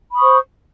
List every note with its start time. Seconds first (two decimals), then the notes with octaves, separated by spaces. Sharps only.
0.12 B5
0.15 D#6
0.18 C#6
0.21 C5